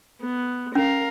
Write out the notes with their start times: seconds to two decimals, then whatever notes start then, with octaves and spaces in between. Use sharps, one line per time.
0.21 B3
0.75 C#4 A#4 F5